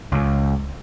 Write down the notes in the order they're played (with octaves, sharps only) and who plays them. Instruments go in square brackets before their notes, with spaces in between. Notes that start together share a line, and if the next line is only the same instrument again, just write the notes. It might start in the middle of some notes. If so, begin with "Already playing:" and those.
[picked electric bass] C#2